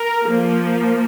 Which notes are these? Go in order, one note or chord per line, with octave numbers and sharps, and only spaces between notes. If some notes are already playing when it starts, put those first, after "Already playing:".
Already playing: A#4
F3 A#3